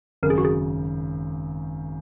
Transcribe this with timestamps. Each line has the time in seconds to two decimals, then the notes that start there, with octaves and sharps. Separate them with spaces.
0.23 G#1 F#2 C#3 A#4
0.30 G#4
0.38 F#4
0.45 G#4